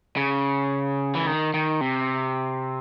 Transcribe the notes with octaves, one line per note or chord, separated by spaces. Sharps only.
C#3
E3
D#3
D#3
C3